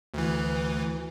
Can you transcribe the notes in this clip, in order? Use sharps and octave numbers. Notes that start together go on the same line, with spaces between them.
D2 E3